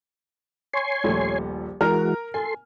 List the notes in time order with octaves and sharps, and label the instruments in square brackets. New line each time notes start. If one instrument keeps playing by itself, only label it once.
[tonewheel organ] C#5 G#5 C6
[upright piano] D#1 A#1 A3
[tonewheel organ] E3 G#3 F#4 [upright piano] A#4 A#5 F6
[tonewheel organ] A4 C6 [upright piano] G#5